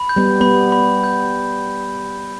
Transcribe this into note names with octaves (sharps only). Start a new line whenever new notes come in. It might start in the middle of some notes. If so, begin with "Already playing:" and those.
Already playing: B5
G6
G3 B3
G3 B3 B5
B5
G6